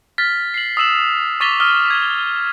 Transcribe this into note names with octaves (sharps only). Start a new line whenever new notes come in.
F6 A6 B6
C7 F#7
D#6 E6 E7 F#7
C#6 D6 A6 B6 F7 G7
D#6 F6
G#6 B6